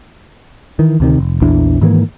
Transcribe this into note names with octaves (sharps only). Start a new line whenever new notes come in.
D#3 E3
D2 C3 D#3
F1
A#1 E2 E3 D4
G#2 D#3 E3 A#3